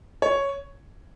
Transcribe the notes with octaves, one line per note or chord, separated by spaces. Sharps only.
C#5